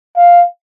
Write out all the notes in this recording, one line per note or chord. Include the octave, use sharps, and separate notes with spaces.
F5